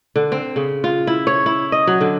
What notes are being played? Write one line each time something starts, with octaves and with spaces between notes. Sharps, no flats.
D3
C4
C#3
F4
E4
C#5
E4
D#5
F#3
D3